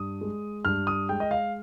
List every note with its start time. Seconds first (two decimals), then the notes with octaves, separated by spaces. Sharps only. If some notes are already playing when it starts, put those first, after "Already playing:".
Already playing: G2 D#6
0.21 G#3
0.65 G2 F6
0.87 D#6
1.09 G#3 G5
1.20 D#5
1.31 F5